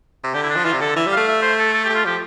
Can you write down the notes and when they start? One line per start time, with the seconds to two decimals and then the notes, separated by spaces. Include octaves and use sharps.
0.24 C3
0.34 D3 G4
0.42 E4
0.50 D4
0.56 F3
0.64 E3 F4
0.72 C3
0.80 D3 A4
0.96 E3 E5
1.07 G3
1.12 A3 F5
1.28 E5
1.42 C5
1.59 A4
1.74 A4
1.84 A3 G4
1.95 F4
2.05 F3 G4